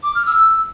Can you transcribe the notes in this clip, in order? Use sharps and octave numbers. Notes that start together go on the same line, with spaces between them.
D6
F6
E6